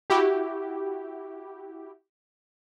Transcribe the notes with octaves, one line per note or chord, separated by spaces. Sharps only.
E4 F#4 G4